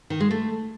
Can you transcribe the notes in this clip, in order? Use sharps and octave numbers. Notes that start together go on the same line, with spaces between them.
D#3
G#3
A3